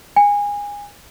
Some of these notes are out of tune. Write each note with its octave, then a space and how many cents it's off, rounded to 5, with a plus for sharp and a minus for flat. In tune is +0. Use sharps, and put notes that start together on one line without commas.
G#5 -25